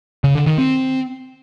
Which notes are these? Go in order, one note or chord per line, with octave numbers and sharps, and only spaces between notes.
C#3
D3
D#3
C4